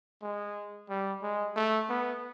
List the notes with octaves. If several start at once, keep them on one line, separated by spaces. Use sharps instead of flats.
G#3
G3
G#3
A3
B3